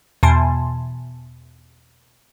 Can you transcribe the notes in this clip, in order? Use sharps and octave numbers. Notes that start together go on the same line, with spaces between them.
E2 B2 G#5 A5 C6